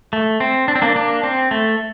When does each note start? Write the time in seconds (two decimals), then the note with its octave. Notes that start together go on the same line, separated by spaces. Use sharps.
0.13 A3
0.40 C4
0.68 D4
0.75 C4
0.82 A#3 D4
0.96 A#3 D4
1.23 C4
1.51 A3